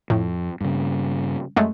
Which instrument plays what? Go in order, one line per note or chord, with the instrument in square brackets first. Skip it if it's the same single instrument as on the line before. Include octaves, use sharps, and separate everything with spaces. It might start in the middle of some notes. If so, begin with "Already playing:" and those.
[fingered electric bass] F2 [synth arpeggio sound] A2
[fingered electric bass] G2 C#3
[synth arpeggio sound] F#2 G#3 A3